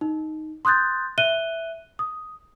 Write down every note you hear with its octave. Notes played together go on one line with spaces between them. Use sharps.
D#4
C6 D#6 F#6 G6 A6
E5 F#6 D#7 G7
D#6